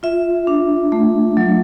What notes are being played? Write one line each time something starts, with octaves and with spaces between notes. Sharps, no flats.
F4 E5
D4
A3
F#3